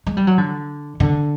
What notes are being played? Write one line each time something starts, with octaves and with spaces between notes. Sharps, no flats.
G#3
G3
F#3
D3
D3